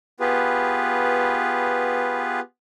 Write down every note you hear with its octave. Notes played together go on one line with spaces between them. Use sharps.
B3 F4 G4 G#4 B4